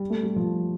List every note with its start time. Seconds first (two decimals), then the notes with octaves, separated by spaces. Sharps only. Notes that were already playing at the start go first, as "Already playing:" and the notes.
Already playing: G3
0.10 A3
0.23 G3
0.36 F3